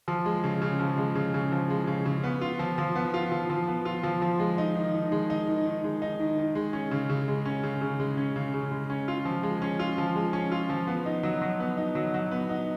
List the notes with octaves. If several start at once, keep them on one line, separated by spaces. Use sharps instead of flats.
F3
G#3
C#3
C#3
F3
G#3
C#3
C#3
F3
G#3
C#3
C#3
B3
F4
F3
F3
B3
F4
F3
F3
B3
F4
F3
F3
G#3
D#4
D#3
D#3
G#3
D#4
D#3
D#3
G#3
D#4
D#3
D#3
G#3
C#4
C#3
C#3
G#3
C#4
C#3
C#3
G#3
C#4
C#3
C#3
G#3
C#4
F4
F3
G#3
C#4
F4
F3
G#3
C#4
F4
F3
B3
D#4
F#3
F#3
B3
D#4
F#3
F#3
B3
D#4